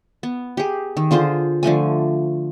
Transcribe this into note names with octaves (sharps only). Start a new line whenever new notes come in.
B3
G4 G#4
D#3
D3 F4 G#4 C5
D3 F3 A3 G#5